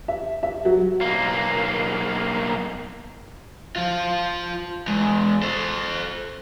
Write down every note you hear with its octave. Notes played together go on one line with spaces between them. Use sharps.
E5
E5
F#3
B1 A#3
F3 F4
E2 G#3
A4 C5